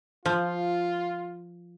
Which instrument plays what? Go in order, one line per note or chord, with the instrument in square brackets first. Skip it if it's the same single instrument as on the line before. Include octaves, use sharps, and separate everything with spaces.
[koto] F3 [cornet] F4